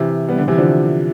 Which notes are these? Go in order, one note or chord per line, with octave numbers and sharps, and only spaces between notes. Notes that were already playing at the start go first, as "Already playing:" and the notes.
Already playing: C3 E3
G3 B3
D3
C3 E3
D3 F3